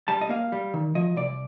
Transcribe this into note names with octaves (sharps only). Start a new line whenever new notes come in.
G3 A5
D#5
A#3 F5
G3
D#3
F3 D#5
C2 D5